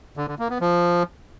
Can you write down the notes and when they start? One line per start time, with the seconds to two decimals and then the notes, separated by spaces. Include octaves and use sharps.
0.17 D3
0.28 D3
0.39 A#3
0.50 B3
0.61 F3